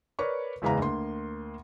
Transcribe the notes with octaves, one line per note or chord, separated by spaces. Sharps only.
A#4 B4 C#5 D5 C#6
F#1 E2 G#3 B4 F5 A#5
D2 A#3 C6